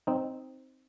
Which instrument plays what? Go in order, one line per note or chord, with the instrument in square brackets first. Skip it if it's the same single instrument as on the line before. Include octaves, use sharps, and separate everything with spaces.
[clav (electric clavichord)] C4 D#4